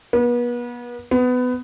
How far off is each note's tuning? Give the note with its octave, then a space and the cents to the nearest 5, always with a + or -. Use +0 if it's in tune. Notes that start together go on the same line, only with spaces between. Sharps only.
B3 -35
B3 +20